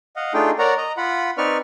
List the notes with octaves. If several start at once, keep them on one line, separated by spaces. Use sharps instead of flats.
D#5 F5 F#5
A3 D4 D#4 F4 G#4 G5
A#4 C#5 D5 F#5 A#5
D#5 A#5
F4 F#5 B5
C4 D#4 B4 D5 C#6 F6